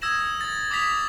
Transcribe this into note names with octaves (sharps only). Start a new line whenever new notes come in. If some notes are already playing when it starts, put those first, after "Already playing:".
D#6 E6 G#6 A#6 E7 F#7
A6
D6 D#6 G#6 A#6 B6 F7